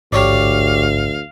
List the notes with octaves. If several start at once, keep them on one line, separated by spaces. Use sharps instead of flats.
A1 D2 G#2 G4 C#5 D5 F5